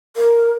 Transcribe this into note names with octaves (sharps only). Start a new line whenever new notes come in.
A#4